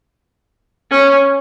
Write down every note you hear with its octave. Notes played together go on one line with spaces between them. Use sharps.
C#4